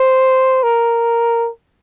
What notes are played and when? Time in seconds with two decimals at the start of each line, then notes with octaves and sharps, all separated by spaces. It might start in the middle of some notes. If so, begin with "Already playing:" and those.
Already playing: C5
0.64 A#4